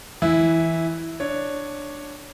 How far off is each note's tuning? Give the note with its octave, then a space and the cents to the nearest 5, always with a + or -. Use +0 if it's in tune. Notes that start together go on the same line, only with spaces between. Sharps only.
E3 +0 E4 -10
D4 +5 C#5 +0